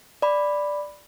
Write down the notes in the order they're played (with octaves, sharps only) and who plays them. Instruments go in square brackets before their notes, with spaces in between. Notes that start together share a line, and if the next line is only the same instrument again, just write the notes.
[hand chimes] D5 B5